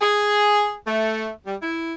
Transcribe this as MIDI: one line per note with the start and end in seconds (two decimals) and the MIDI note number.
0.01 0.75 68
0.86 1.31 57
1.46 1.55 55
1.61 1.94 64